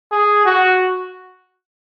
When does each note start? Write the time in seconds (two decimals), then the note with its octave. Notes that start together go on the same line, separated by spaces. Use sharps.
0.12 G#4
0.45 F#4